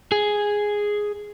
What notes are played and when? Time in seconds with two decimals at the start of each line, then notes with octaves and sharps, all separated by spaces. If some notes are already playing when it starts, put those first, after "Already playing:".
0.12 G#4